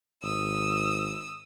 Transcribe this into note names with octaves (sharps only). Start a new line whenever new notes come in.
G#1 D#6 E6